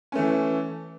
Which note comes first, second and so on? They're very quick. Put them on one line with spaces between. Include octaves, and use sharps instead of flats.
C#4 A3 E3